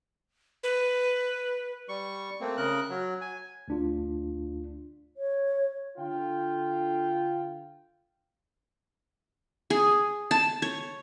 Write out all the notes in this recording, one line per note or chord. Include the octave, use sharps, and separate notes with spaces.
B4
G3 C#6
A3 A#3 C4
C#3 A#4 F#6
F#3
G#5
D2 D4 F4
C#5
D3 F4 G5
G#4
A5
C#5